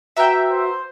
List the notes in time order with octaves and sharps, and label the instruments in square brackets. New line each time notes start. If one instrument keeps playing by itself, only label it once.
[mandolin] B3 A#5 [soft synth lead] F#4 [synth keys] E5 G5
[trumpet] C5